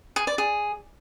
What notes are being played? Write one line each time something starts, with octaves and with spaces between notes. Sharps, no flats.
G#4
D5
G#4